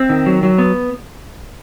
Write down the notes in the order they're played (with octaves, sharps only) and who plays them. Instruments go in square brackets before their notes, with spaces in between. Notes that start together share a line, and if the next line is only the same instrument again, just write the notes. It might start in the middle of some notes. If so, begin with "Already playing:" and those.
Already playing: [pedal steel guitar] C4 E5
D#3
F#3
F#3
B3